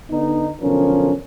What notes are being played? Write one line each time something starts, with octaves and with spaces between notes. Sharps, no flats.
D3 B3 D#4
B1 D3 F3 C#4 A#4